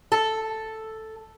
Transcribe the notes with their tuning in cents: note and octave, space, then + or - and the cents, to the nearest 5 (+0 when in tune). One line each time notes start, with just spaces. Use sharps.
A4 +0